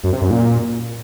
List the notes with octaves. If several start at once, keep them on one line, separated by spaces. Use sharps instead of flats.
F#2
C3
F#2
A#2